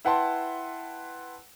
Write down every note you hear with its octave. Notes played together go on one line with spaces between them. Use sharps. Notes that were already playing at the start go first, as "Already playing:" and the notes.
E4 B4 F#5 G5 A5 C6